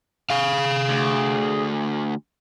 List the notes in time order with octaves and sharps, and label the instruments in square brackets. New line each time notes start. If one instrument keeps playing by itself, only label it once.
[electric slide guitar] G#4 F5
[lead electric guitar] D2